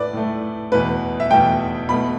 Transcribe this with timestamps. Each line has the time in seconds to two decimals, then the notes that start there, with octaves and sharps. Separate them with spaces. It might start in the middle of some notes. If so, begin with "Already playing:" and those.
Already playing: A2 A3 B4 D5
0.13 A2 A3
0.71 E2 B2 A3 B4
1.20 E5
1.30 E2 B2 A3 G5
1.89 B2 A3 B5